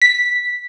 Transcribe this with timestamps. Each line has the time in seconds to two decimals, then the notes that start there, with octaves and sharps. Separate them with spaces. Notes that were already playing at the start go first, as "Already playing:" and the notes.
0.02 B6